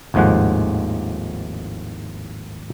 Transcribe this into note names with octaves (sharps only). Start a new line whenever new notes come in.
G#1 D#2 A2 F3 G#3 F#5